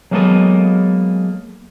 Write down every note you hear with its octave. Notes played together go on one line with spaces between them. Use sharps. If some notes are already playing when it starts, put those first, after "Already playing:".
F#3 G#3 A#3 B3 A4 D#5